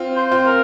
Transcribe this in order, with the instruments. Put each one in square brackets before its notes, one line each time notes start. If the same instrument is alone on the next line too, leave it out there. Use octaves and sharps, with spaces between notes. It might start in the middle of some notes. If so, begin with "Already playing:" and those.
Already playing: [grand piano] C4 F4
[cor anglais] C5
[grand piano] C4 F4
[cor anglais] A#4